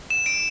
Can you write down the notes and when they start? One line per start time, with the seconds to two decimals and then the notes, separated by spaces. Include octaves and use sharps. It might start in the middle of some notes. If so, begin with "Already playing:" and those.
0.10 E7
0.26 D7